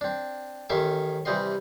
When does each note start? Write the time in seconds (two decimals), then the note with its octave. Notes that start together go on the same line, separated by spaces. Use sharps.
0.01 C4 D4
0.70 A1 D#3 C#4 E5 C6 D6
1.25 C3 E3 G3 C4 D#5 C6